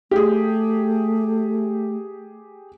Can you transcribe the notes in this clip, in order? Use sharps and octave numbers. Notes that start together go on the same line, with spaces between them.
A3 G4 G#4